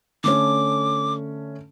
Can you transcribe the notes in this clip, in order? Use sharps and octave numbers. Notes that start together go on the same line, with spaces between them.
D3 A3 C#4 D6